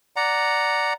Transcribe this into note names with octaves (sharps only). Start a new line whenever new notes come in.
D5 F#5 A#5